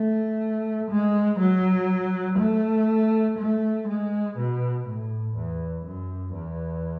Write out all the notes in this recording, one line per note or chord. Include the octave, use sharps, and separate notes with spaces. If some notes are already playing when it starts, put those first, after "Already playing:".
Already playing: A3
G#3
F#3
A3
A3
G#3
B2
A2
E2
F#2
E2